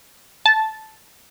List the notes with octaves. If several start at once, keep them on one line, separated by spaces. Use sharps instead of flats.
A5